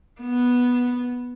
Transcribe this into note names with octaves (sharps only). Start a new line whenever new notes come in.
B3